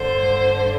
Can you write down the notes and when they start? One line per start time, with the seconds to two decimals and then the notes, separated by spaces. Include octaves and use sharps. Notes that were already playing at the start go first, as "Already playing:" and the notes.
Already playing: G2 D3 C5